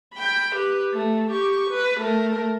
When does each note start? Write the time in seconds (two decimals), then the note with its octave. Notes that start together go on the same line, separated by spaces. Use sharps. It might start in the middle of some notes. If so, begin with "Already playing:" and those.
0.14 G5 B5
0.56 G4 B4
0.94 A3
1.31 G4 C#6
1.71 B4
2.00 A3 A#4